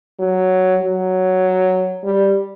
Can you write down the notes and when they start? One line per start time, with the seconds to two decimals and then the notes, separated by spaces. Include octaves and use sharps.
0.19 F#3
0.82 F#3
2.04 G3